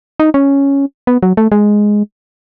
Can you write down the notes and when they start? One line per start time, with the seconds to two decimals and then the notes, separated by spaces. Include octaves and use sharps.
0.20 D#4
0.34 C#4
1.07 B3
1.23 F#3
1.37 A3
1.52 G#3